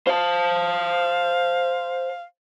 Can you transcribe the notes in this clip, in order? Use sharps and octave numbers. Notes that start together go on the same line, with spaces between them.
C5 F5 A5